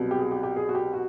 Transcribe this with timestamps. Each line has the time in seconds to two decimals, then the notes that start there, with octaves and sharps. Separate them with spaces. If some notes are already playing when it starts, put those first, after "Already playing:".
Already playing: C2 B2 F#3
0.11 G4
0.19 G#4
0.31 G4
0.43 G4
0.56 G#4
0.69 F#4
0.75 G4
0.93 F#4